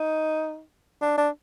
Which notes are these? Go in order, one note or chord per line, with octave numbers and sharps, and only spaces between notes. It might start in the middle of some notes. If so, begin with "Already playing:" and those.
Already playing: D#4
D4
D4